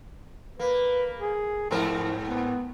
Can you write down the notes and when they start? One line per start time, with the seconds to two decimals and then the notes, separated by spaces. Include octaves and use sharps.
0.60 A#3 B4
1.20 G#4
1.71 G#2 F3 C4 A#4
2.27 B3